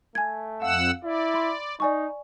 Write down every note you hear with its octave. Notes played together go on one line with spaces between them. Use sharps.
A3 G#5 G#6
F2 F5 F#5 E6
E4 D5
B5 C6
D#4 D5 G#5 C#6